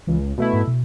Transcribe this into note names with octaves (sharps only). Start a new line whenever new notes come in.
C#2 E3
B2 A3 E4
G#2
B2